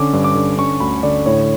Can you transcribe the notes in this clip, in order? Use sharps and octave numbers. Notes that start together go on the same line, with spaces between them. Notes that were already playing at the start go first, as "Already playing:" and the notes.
Already playing: D3 C#4 D6
G2
D6
D3
C#4 C#6
D2 B5
D3 D5
A2 C#5